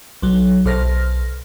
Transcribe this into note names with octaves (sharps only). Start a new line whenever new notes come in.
B1 F#3
B1 A4 C5 F6 A#6